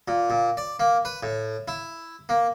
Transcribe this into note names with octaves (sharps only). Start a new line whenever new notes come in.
A#2
A#2
D5
A#3
B4
A2
E4
A#3